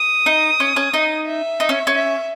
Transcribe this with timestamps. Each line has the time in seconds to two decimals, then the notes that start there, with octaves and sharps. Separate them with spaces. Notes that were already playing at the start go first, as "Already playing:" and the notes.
Already playing: D#6
0.26 D#4
0.60 C#4
0.76 C#4
0.94 D#4
1.26 E5
1.60 D#4
1.69 C#4
1.87 C#4
1.93 E5